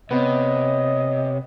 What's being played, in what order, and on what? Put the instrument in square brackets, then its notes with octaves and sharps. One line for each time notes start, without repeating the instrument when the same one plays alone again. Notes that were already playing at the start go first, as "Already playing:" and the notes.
[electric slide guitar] C3 [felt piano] B3 [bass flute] C#5 [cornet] D#5